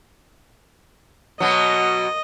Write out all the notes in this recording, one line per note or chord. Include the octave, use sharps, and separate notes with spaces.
B2 F#3 D#5